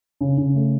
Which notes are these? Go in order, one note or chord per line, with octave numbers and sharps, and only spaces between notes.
C#3
C#3
A3